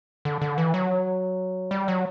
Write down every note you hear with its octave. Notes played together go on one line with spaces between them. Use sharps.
D3
D3
E3
F#3
G3
F#3